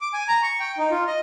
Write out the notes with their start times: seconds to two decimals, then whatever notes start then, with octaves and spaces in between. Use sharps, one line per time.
0.01 D6
0.13 G#5
0.28 A#5
0.43 C#6
0.60 G5
0.78 D#4
0.91 F4
1.07 D#5